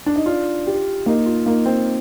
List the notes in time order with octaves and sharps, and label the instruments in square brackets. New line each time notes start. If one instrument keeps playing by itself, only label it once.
[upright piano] D4
D#4
[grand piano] D4 [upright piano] F4
[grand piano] G4
[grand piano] A#3 [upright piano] D#4
[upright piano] F4
[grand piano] A#3 [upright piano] D#4
[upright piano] C4